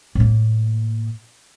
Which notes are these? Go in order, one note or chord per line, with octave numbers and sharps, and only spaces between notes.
A2 A#3